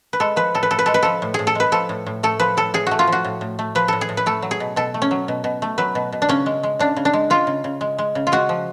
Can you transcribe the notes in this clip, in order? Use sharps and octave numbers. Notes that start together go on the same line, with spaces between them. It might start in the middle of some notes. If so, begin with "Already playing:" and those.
B4
G#3 A4
F3 B4
A2 A4
B4
A2 A4
B4
G#3 A4
B4
F3 A4
A2
A2 G#4
A4
G#3 B4
F3 A4
A2
A2
A3 A4
F3 B4
A2 A4
A2 G#4
A3 F#4
F4
F3
F#4
A2
A2
A3
F3 B4
A2 A4
G#4
A2
B4
A3 A4
F#3
G#4
B2
B2 A4
A3
C#4
F#3
B2
B2
A3
F#3 B4
B2
B2
D4
C#3 C#4
G#3
G#3
C#3 D4
C#3
D4
G#3
G#3 F4
C#3
C#3
G#3
G#3
C#3
F4
G#3 F#4
F3